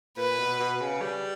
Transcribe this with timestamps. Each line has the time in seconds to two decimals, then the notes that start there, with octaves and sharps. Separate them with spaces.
0.17 A#2 B4
0.38 B2
0.59 B2
0.81 C#3
1.01 G3